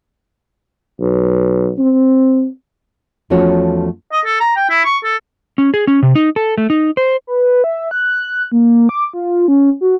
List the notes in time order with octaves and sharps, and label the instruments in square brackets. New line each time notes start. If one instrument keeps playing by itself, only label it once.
[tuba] B1
C4
[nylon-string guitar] E2 F3 A3 C#4 F#4 C#5
[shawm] D#5
A4
A#5
G5
E4
C#6
A4
[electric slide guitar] C#4
G#4
C#4
C3
D#4
A4
A3
D#4
C5
[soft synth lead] B4
E5
F#6
A#3
D6
F4
C#4
F#4